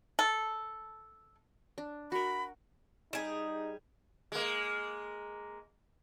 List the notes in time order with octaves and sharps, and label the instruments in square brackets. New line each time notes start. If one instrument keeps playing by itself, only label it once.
[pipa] A4
[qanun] D4
[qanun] F#4 A#4 [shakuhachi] B5
[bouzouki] G3 G#4 [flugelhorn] D#4
[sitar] G#3 A#3